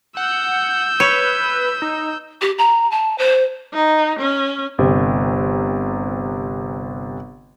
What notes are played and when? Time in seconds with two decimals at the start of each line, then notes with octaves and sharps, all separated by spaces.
0.17 F#5 E6 G6
1.00 B4 C#5
1.82 D#4
2.41 G4
2.58 A#5
2.91 A5
3.18 C5
3.74 D#4
4.20 C#4
4.78 G1 C3